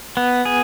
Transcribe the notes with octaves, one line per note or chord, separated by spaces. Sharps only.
B3
G#4